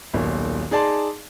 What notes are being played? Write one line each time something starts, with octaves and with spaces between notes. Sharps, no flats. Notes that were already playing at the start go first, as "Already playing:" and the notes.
D#1 B1 A#2
D#4 G#4 D5 A5 C6